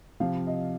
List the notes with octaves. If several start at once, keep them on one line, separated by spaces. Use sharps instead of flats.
C3 F3 F5
D#5